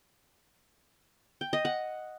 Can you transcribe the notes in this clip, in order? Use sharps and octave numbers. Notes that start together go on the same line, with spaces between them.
G5
D#5
F#5